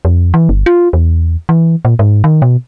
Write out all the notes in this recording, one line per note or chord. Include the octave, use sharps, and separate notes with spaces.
F2
E3
G1
F4
E2
E3
A#2
G#2
D#3
B2